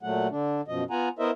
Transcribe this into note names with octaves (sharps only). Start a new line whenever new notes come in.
A#2 F#3 A3 F#5
D3 D4
F#2 B2 F3 D#5
B3 F4 F#5 G#5 A#5
B3 E4 A#4 C5 D#5 E5